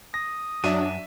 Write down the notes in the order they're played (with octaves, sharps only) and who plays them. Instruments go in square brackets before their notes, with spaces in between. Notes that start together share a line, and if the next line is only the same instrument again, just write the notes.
[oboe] D#6 [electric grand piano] A#6
[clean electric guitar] F#2 [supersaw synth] F#3 D4 [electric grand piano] E5 D#7